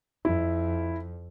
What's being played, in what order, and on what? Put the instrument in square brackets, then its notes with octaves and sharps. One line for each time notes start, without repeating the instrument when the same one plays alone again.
[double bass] F2 [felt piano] E4